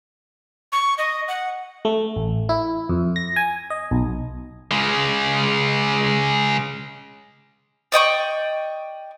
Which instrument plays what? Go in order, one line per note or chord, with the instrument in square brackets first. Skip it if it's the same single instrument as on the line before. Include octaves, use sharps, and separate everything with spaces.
[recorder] C#6
D#5
F#5
[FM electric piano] A3
A1
E4
F2
A#6
G#5
D#5
B1
[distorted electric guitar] C#3 G#3
[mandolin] D5 D#5 G5 C#6